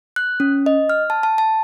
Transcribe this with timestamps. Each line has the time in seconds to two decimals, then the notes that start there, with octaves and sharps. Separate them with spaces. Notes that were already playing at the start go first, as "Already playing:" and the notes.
0.16 F#6
0.40 C#4
0.66 D#5
0.90 F6
1.10 A5
1.23 A5
1.38 A5